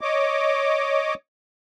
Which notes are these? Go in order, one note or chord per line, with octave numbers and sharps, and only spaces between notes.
C#5 D#5 D6